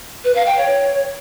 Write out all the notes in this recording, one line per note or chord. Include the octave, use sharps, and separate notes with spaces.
B4
F5
G5
C#5